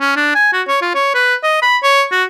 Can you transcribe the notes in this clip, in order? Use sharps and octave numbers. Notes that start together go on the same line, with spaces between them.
C#4
D4
G#5
F#4
C#5
F4
C#5
B4
D#5
B5
C#5
F#4